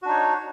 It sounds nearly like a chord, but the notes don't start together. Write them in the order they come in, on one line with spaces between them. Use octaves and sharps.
F#4 D4 D#4 C#5